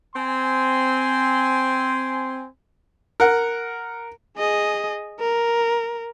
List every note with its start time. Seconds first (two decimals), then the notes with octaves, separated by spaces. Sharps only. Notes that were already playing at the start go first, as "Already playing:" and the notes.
0.15 C4 G#5 C6
3.20 A#4 F#5
4.37 G#4 D#5
5.20 A#4